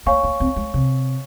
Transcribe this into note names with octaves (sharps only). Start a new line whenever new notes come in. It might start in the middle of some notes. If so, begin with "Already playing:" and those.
A#3 C#5 F5 G#5 C#6
A#3
C4
G#3
C3